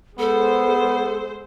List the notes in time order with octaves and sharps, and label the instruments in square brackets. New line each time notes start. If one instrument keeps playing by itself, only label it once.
[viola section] G#3 C5 [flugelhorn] B3 [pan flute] A4